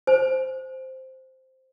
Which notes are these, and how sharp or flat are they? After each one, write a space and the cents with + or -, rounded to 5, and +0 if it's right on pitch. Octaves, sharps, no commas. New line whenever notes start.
C5 +0 G#5 +35